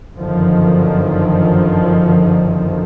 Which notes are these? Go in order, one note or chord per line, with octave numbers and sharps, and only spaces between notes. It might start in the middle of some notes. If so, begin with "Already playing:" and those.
G1 F#2 D3 D#3 F3